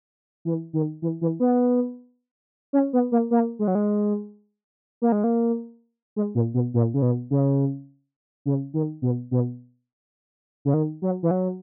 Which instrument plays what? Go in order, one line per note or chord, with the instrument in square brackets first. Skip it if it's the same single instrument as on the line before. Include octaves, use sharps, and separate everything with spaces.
[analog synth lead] E3
D#3
E3
E3
B3
C#4
B3
A#3
A#3
G#3
F#3
G#3
A#3
G#3
A#3
G#3
A#2
B2
A#2
C#3
B2
C#3
C#3
D#3
B2
B2
C#3
D#3
F#3
E3
F#3